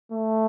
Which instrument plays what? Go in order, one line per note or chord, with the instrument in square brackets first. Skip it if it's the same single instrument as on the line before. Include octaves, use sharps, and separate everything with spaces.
[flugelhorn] A3